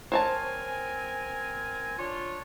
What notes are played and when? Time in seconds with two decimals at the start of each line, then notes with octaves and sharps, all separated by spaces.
0.12 C4 A#4 C5 C#5 G#5 A5
1.97 D4 F4 C#5